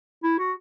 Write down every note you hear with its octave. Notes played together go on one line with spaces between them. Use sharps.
E4
F#4